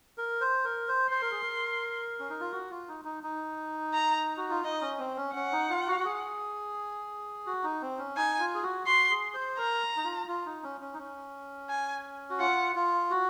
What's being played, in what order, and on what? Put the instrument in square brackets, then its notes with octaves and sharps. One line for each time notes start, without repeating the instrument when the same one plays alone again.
[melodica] A#4
C5
A#4
C5
[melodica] C5 [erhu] C6
[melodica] A#4
G#4
A#4
C#4
D#4
F4
F#4
F4
D#4
D#4
D#4
[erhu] A#5
[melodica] F#4
F4
[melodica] D#4 [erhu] D#5
[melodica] C#4
C4
C#4
[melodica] C#4 [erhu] F#5
[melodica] D#4
F4
F#4
F#4
G#4
F#4
D#4
C4
C#4
[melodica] D#4 [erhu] G#5
[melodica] F4
G#4
F#4
[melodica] F#4 [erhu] C6
[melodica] G#4
C5
[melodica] A#4 [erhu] A#5
[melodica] D#4
F4
F4
D#4
C#4
C#4
D#4
C#4
[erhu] G#5
[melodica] F#4
[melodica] F4 [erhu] F#5
[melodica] F4
F#4